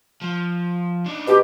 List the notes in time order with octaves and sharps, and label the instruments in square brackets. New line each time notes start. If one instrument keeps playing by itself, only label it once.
[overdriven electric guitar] F3
D4 D#4
[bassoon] B2 [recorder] G4